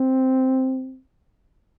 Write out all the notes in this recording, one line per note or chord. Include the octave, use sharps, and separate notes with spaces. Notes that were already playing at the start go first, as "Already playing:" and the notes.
Already playing: C4